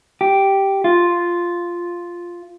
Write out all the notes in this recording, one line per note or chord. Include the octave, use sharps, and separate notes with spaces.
G4
F4